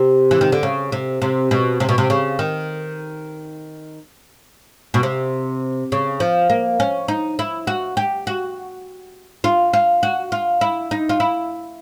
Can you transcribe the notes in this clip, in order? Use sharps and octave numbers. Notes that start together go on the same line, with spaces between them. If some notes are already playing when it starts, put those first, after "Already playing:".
Already playing: C3
E3
D#3
D3
C#3
C3
C3
B2
C3
B2
C3
C#3
D#3
B2
C3
C#3
F3
A#3
C#4
D#4
E4
F#4
G4
F#4
F4
F4
F#4
F4
E4
D#4
F4
E4